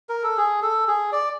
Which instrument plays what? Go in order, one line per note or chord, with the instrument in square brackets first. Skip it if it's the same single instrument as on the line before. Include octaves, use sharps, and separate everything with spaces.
[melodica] A#4
A4
G#4
A4
G#4
D5